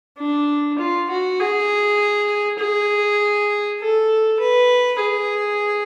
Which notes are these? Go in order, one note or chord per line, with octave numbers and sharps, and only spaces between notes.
D4
F4
F#4
G#4
G#4
A4
B4
G#4